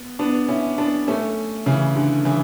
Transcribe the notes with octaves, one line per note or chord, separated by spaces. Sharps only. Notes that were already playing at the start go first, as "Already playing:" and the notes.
Already playing: B3
B3 D4
C#4 E4
B3 D4
A3 C#4
C#3 E3
D3
C#3 E3